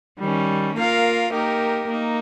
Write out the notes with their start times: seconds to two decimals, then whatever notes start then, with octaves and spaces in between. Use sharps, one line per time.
0.18 D#3 G3 C#4
0.76 A#3 F4 A#4 F5
1.32 A#3 D#4 G4 A#4
1.89 A#3 D#4